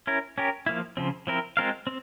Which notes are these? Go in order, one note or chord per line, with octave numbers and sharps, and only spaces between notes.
C#4 E4 A#4
C#4 G4 A#4
F3 A#3 E4
C#3 F3 C4
F3 C4 E4 A#4
G#3 C4 F4 A#4 F5
C4